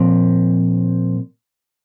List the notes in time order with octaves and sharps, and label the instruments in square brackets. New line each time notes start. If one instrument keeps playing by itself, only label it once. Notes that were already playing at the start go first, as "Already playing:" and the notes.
Already playing: [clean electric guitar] A#2 F3 C4